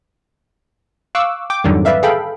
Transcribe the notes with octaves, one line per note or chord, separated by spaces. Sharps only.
F5 C#6 D6 E6 F#6
G5 D6
F2 G#2 D3 D#3 F#3 G3
B4 D5 E5 F5
G#4 A4 F5 G5 B5